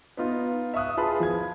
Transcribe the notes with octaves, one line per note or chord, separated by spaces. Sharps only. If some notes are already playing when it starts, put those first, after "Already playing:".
B3 D#4 F4
E5 C#6 D#6 F#6
F4 G#4 B4 A5 B5
F3 G#6